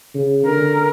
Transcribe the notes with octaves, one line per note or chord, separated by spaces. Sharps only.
C#3
D3 A#4